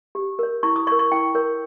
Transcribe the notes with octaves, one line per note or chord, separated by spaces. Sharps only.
G4
A#4 C#5
E4 C#6
D#6
A#4 C#5 C#6
C#6
E4 G5
A#4 C#5